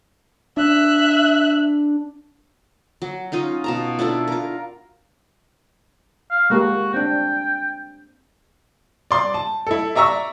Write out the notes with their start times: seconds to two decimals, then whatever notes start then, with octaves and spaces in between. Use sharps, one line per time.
0.57 D4 E5 F#6
3.02 F#3
3.32 C#4 D#4 F4 D#5
3.64 B2 A5 A#5
3.99 D4 E4 F4 A4
4.28 F4 A#4
6.31 F5
6.50 G#3 A#3 F#4 G4
6.94 C4 D4 G5
9.11 D5 C6 D6
9.34 A5
9.67 E4 A4
9.96 D5 E5 A#5 C#6 E6